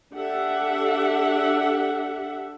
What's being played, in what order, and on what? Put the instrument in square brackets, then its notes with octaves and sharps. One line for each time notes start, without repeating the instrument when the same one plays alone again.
[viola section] D4 G4 A4 E5 F#5